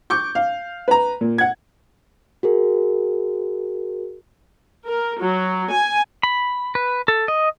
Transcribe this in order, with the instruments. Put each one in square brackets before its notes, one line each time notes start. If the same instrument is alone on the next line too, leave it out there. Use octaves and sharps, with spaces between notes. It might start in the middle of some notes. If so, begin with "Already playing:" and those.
[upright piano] C#6 D6 G6
F5
B4 A#5
A#2
F#5 G#6
[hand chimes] F#4 G#4 A#4
[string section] A#4
F#3
G#5
[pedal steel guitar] B5
B4
A4
D#5